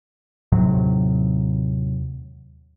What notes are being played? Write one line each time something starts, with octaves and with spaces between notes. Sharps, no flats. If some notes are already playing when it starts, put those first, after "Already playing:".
D#2 A2 C3 F#3